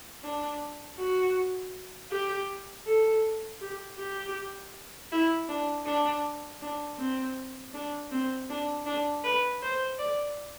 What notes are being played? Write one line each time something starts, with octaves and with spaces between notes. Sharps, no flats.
D4
F#4
G4
A4
G4
G4
E4
D4
D4
D4
C4
D4
C4
D4
D4
B4
C5
D5